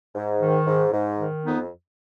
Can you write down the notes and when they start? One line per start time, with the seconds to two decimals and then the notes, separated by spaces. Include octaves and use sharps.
0.15 G#2
0.41 D#3
0.66 G#2
0.92 G#2
1.18 D#3
1.44 F2 B3 D#4